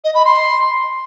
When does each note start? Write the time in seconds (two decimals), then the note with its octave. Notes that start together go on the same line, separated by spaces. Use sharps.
0.04 D#5
0.15 B5
0.25 C6